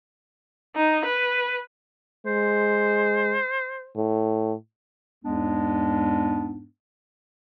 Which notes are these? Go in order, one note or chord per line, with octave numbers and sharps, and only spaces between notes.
D#4
B4
G#3 C5
A2
E2 G#2 G#3 B3 D4